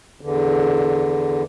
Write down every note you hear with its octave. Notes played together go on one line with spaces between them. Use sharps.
E2 D3